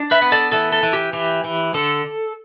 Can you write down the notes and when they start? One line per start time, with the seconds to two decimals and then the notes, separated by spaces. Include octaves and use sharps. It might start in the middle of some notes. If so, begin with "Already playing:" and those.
Already playing: D4
0.11 B4 E5
0.22 B3
0.32 A4 D5
0.52 E3 A4
0.72 A4
0.83 E3
0.93 G4
1.13 E3 G4
1.44 E3
1.74 D3 A4